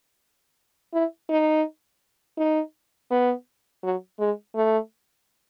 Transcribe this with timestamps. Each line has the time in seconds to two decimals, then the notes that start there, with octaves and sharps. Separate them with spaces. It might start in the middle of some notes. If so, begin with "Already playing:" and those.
0.93 E4
1.30 D#4
2.38 D#4
3.11 B3
3.83 F#3
4.20 G#3
4.55 A3